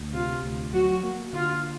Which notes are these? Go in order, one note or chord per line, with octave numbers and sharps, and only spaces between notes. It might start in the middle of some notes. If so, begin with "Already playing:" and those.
Already playing: D2
C3 F4
D2
F#3 F#4
A#3
D3 F4